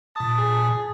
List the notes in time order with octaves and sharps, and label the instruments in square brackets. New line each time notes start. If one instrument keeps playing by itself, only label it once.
[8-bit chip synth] A#2 D#6 [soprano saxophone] A5
[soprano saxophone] G#4